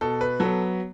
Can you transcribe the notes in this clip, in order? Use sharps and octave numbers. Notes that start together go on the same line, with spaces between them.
B2 A4
B4
F#3 B3 A4